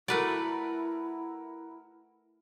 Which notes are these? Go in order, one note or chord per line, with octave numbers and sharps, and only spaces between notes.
A3 E4 F#4 A#4 B4 D5